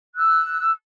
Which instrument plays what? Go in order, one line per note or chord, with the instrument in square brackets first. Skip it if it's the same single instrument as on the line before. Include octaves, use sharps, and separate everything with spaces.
[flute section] E6 F#6